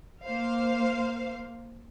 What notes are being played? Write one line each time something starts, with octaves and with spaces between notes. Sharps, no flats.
A#3 C5 F5